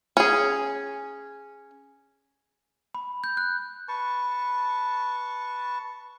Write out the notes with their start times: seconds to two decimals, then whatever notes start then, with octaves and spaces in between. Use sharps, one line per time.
0.17 C#4 G#4
2.95 B5
3.24 G6
3.37 F#6
3.88 B4 A5 C#6